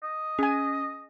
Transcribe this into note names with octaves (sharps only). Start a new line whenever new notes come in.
D#5
C#4 G#4 G#5